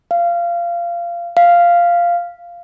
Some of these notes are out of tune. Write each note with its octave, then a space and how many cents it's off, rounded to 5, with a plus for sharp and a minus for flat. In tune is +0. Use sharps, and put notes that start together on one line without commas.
F5 -20
F5 -5